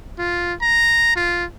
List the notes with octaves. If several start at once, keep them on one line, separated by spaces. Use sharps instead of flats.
F4
A#5
F4